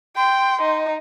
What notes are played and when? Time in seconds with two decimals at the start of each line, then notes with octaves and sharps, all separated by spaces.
0.17 G5 C6
0.62 D#4